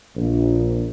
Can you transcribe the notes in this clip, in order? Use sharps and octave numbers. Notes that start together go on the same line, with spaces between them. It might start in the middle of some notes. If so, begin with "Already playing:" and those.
A#1